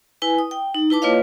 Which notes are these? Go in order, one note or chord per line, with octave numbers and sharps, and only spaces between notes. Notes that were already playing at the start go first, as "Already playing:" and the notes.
E4 B4 G#5
D#6
G5
D#4
E4 B4 A5 D6
A#3 F4 B4 C#5 D#5 F5